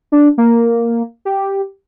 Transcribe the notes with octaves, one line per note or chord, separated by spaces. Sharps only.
D4
A#3
G4